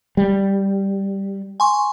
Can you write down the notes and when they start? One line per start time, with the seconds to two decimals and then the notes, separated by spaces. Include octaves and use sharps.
0.17 G3
1.60 G#5 C6 C#6